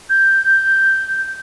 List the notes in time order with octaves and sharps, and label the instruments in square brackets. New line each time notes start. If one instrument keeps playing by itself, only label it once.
[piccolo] G6